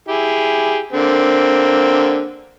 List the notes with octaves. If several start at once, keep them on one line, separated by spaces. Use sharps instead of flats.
E4 G4 G#4
D3 A#3 C4